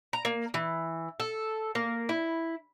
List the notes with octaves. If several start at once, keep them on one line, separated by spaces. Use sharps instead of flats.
A#5
A#3
E3
A4
A#3
E4